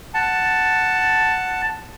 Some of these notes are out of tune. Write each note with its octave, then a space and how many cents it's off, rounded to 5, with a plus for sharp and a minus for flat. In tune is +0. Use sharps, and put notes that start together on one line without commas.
F#5 +0 A5 +5